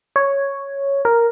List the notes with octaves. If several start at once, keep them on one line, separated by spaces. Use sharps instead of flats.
C#5
A#4